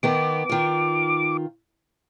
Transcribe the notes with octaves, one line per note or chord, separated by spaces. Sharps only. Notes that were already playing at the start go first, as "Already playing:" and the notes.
D#3 B3 A#4 D6
D#3 F4